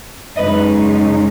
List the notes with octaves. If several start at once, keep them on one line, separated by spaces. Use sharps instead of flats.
F#2 C#3 G#3 D#4 B4 D#5